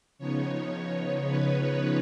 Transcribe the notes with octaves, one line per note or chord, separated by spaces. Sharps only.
C#3 F3 B3 D#4 C#5
B4